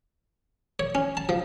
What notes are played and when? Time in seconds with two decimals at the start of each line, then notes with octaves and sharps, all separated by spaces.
0.79 C#5
0.95 C#4
1.17 A5
1.29 F3